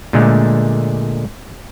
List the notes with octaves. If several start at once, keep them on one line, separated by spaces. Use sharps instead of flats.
A#2 D3 G#3 A3